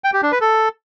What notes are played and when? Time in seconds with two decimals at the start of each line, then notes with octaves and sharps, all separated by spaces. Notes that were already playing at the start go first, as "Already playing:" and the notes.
0.04 G5
0.13 G4
0.23 D4
0.32 B4
0.41 A4